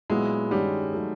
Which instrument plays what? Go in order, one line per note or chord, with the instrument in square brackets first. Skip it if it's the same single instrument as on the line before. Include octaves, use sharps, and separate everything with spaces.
[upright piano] A#2 F#3 B3 E4 [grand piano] G#3
[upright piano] G2 D#3 G#3 C#4 F#4 [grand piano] G3
[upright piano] D#3 F#3 A3